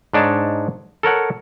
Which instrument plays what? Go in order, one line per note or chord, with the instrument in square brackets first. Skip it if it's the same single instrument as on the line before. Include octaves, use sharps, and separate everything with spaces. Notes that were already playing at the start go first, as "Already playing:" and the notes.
[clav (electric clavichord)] G#2 D4 D#4 C#5 A5
A4 A#4 C#5 F#5